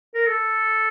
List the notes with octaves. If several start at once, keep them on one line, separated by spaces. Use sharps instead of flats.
A#4
A4